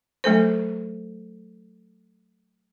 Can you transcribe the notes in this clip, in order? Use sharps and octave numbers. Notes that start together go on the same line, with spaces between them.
F#3 A3 A4 C5